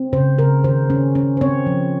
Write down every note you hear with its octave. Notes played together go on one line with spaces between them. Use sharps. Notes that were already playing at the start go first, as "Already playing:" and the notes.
Already playing: C4
C#3 C5
C#3 A#4
D#3 C5
C#4
C#4
C5
C4 C#5
F3